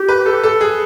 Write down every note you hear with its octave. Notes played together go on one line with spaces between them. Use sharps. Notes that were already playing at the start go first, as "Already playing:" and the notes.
Already playing: G4
B4
A4
A4
G#4